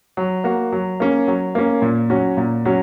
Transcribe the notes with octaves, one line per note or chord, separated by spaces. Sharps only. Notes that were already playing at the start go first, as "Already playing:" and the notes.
F#3
A#3 F#4
F#3
A#3 C#4
F#3
A#3 C#4
A#2
F#3 C#4 F#4
A#2
F#3 C#4 F#4